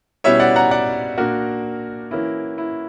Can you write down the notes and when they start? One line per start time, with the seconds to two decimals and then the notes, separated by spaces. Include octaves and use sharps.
0.24 B2 G3 C#4 E4 C#5 E5
0.40 D5 F#5
0.56 F#5 A#5
0.71 D5 F#5
1.18 A#2 A#3 D4 F#4 A#4
2.11 E3 A#3 C#4 E4
2.58 E4